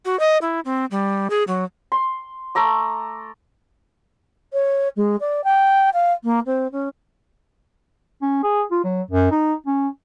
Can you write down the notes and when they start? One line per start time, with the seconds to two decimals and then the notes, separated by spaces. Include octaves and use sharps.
0.05 F#4
0.20 D#5
0.42 E4
0.65 C4
0.91 G3
1.30 G#4
1.48 F#3
1.92 C6
2.55 A3 A4 A#5 D6
4.53 C#5
4.96 G#3
5.20 D5
5.44 G5
5.94 F5
6.24 A#3
6.46 C4
6.72 C#4
8.22 C#4
8.43 G#4
8.71 F4
8.84 F#3
9.11 F#2
9.31 D#4
9.67 C#4